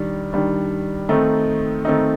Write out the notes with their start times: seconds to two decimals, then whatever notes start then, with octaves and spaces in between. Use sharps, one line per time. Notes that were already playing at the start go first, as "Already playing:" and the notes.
Already playing: D#3 G3 D4
0.33 D#3 G3 D4
1.09 D#3 A3 C4 D#4
1.85 D#3 A3 C4 D#4